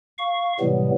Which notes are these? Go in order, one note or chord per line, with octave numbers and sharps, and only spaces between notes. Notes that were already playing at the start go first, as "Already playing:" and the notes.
F5 C#6
A2 C3 E3 F#3 G3 B3